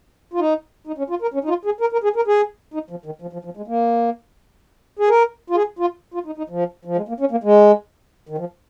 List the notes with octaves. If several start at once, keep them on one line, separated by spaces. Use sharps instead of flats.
F4
D#4
D#4
C#4
F4
A#4
C#4
D#4
F4
G#4
A#4
A#4
G#4
A#4
G#4
D#4
F3
D#3
F3
F3
F3
G#3
A#3
G#4
A#4
F4
G#4
F4
F4
D#4
D#4
F3
F3
G#3
A#3
C#4
A#3
G#3
D#3
F3